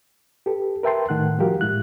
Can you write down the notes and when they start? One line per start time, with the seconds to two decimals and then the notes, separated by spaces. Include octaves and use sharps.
0.46 G4 A4 B4
0.83 A#4 B4 E5 G5 A5 C6
1.09 A2 D#3 A3 F#5 F#6
1.39 F3 G3 F#4 G4 A#4 F5
1.61 A2 G#3 E4 F#6